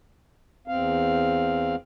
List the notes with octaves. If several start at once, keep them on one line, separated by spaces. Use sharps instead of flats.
E2 C4 F5